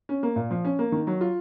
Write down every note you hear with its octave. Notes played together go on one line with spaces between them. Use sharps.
C#4
A#3
A#2
F3
C#4
A#3
D#3
F#3
F4